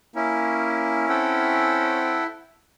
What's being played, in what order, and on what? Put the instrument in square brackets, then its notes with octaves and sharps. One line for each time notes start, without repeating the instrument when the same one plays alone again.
[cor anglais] A#3 [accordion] C#4 [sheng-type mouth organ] E4
[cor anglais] C4 [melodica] A4 F#5 G5